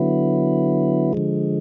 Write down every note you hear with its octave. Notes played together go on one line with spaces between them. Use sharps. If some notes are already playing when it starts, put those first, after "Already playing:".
Already playing: D3 F#3 B3 E4
D3 F3 G#3